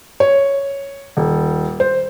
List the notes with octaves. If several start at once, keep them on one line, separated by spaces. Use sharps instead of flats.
C#5
D#1
C5